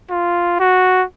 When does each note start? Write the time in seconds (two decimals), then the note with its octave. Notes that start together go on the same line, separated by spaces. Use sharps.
0.10 F4
0.60 F#4